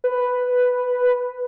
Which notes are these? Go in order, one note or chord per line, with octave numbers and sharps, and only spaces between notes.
B4